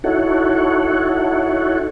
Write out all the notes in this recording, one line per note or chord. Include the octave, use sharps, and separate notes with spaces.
D#4 E4 F#4 A4 C#5 F#5